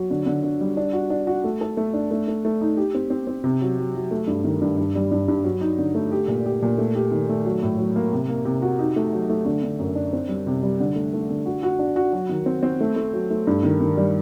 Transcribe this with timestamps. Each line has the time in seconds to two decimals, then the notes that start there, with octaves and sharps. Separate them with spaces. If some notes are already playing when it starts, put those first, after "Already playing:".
Already playing: F#3
0.10 D3
0.26 D3
0.43 D3
0.61 G3
0.77 D4
0.93 F#4
1.10 D4
1.27 F#4
1.44 A3
1.61 A4
1.77 A3
1.94 D4
2.11 A3
2.28 A3
2.45 A3
2.61 D#4
2.77 G4
2.95 C4
3.10 C4
3.27 C4
3.44 C3
3.62 F#3
3.78 F#3
3.95 F#3
4.11 A3
4.27 G2
4.44 D#3
4.61 G2
4.78 G2
4.95 G3
5.11 G2
5.28 G2
5.44 F#3
5.61 D#4
5.78 D3
5.95 A3
6.12 G4
6.28 A#2
6.46 G4
6.62 A#2
6.78 A3
6.95 G4
7.11 D#3
7.29 A3
7.45 F#3
7.63 A2
7.78 F#3
7.96 A#3
8.13 C3
8.28 A#3
8.45 C3
8.62 F#4
8.79 D#4
8.96 A3
9.13 F#3
9.29 A3
9.45 D3
9.63 D3
9.79 F#2
9.95 D4
10.13 C4
10.29 G3
10.47 C3
10.63 G3
10.80 D3
10.96 A3
11.13 A3
11.30 D3
11.46 F#4
11.63 F#4
11.79 D4
11.96 F#4
12.13 F#3
12.29 D#3
12.46 C4
12.63 C4
12.81 A3
12.96 A3
13.13 F#3
13.30 A3
13.47 G2
13.63 D#3
13.81 D#3
13.97 G3